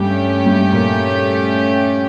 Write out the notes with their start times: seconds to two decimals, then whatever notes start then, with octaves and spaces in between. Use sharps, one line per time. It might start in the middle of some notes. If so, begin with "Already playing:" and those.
Already playing: G2 G3 A3 C#4 G4
0.46 G2 G3
0.73 A#2 A#3